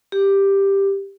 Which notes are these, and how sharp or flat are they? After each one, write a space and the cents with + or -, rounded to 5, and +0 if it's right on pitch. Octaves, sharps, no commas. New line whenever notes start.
G4 +5